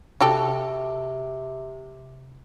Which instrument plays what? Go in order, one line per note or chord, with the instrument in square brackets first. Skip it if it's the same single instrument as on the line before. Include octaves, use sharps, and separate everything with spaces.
[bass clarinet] C3 [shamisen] F#4 G4 A4